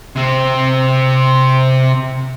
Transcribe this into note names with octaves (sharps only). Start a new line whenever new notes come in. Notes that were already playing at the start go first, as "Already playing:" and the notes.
C3 C4